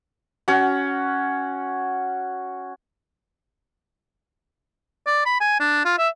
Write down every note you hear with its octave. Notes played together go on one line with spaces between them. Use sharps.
C#4 F#4
D5
B5
G#5
D4
F4
E5